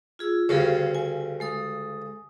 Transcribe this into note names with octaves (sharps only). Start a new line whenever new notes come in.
F4 G#4 E6
D2 G2 C#3 G#4 A4 C5
G#5
G#3 A4 D#6